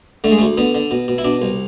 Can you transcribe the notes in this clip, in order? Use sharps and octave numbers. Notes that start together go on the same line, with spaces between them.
D3 A3
G#3
A3
D2
D3 B3
D3
B2
B2
E4
B2 D4
C2